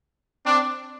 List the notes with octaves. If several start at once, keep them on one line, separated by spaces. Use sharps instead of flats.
C4 D4